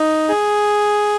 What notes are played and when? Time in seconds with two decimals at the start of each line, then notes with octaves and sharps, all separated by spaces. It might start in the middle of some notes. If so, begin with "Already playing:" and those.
Already playing: D#4
0.29 G#4